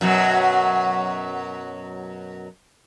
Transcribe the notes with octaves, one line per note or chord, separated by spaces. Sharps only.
F#2 B2 F#3